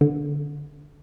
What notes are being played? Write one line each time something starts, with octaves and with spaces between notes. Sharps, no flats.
D3